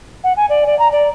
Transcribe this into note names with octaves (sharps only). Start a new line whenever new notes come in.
F#5
G#5
D5
D5
A#5
D5